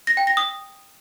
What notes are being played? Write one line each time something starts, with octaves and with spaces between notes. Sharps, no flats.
A#6
G5
A#6
D#6